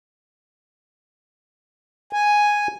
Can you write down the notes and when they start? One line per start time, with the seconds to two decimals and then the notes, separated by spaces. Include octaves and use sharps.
2.13 G#5